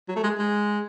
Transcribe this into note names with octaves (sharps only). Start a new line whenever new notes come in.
F#3
A3
G#3
G#3